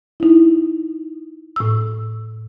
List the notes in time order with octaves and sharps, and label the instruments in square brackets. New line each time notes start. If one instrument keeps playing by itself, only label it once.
[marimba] D#4 E4
A2 E6